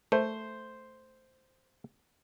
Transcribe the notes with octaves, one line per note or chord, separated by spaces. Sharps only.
A3 C5